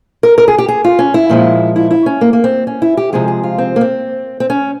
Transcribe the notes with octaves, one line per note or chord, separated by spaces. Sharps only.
A#4
A#4
G#4
G4
G#4
F4
C#4
E4
A#2 F3 G#3
E4
E4
C#4
A#3
A#3
C4
C#4
E4
G4
C3 F3 G#3 G#4
G#4
F4
C4
A#3
C4
C4
C#4